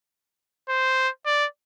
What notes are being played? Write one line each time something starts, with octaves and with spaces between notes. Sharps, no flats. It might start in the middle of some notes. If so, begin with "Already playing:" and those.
C5
D5